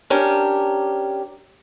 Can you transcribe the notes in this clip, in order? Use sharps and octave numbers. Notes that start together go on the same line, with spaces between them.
C#4 D4 G4 A#4